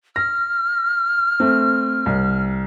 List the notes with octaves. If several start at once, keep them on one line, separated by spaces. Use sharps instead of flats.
F6 A#6
A3 C4
C2